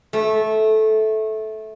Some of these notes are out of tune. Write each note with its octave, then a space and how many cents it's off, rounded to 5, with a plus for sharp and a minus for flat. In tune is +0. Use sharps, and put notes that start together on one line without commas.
A3 -15